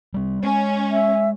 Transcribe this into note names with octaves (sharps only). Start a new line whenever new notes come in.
G3 C4
G#3 C#4
E5